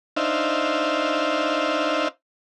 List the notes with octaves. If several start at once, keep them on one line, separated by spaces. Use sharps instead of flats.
D4 D#4 C5 E5 F5